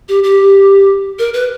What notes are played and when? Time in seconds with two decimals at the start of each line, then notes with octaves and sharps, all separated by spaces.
0.09 G4
0.24 G4
1.19 A#4
1.34 B4